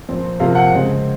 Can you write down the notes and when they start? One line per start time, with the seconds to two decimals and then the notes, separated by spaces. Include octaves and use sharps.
0.08 A#2 F3 C4
0.40 C3 F3 A#3 F5
0.55 F#5
0.71 C#3 G#3 C4